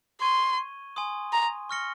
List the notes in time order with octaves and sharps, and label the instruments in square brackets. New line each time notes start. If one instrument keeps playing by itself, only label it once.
[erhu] C6 [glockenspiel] C#6 G#6 D#7 G7
[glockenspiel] G#5 C6 D#6
[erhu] A#5
[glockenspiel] C#6 F6 A#6 C#7 G7